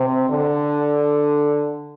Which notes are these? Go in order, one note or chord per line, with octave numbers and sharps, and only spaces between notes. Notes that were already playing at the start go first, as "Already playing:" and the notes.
Already playing: C3
D3